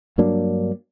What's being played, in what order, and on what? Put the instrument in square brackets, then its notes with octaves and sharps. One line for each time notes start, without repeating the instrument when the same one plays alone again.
[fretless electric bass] G2 F#3 A#3 D4